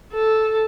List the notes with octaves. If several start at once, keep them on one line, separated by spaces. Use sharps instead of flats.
A4